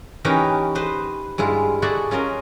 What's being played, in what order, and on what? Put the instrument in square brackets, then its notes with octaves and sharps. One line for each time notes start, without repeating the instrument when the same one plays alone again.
[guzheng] E3 C#4 D#4 G4 A#4 B4
B4 C5 D#5 C6
G2 G#3 E4 F4
F#4 G#4 A4 D5 E5 F#5
C#4 F4 A#4 D#5